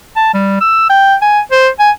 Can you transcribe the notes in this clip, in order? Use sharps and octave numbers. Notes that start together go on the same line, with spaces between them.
A5
G3
E6
G5
G#5
C5
G#5